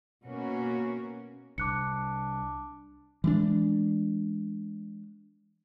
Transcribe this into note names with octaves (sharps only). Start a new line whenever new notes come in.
B2 A#3 C#4 F#4
C2 D4 D6 F#6 C#7
E3 G#3 D4